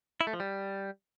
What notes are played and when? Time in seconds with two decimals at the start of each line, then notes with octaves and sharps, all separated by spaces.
0.21 E4
0.27 A3
0.33 F3
0.40 G3